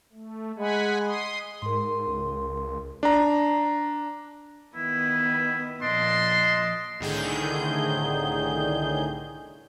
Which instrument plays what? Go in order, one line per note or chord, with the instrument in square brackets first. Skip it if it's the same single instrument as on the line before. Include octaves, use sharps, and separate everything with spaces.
[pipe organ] A3
[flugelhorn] G#3 [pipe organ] F#5 G#5 B5
[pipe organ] C6 D#6
[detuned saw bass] G#2 [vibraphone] A#4 C6
[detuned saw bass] C#2
[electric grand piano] D4 A#5
[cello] D#3 B3 [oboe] E4
[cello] A#2 F3 [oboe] D4 [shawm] D#5 [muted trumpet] C6
[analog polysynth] C2 A2 D3 D#3 G#4 G6